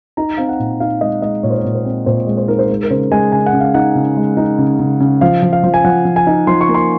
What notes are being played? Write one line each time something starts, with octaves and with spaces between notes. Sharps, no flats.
D#4 A#5
C4 F5
F#5
A#2
D#4 F5
G#3 D#5
G#3 D#5
A#2 C#5
C5
C#5
A#2
C5
C4
A#2 C5
G#3
C5
D#4 A#4
C5
G#3
A#4
C#3 C5
G#3 G#5
C#3 G#5
F#5
C#3
F5
D#4 F#5
C#3
G#3
D#4
C#3
C#3
C#3
F3 F5
F3
F5
F3
G#5
F3 F#5
F3
G#5
D#4
F3 C6
C#6
A#3
C6